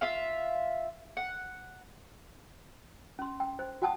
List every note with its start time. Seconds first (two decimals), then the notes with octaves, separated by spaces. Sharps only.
0.01 F4 E5 F5
1.17 F#5
3.19 C#4 C6
3.40 G5
3.59 C5
3.82 F#4 F#5 G5 A5 D#6